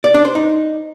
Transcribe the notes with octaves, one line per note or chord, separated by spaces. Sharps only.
D5
D4
C5
D#4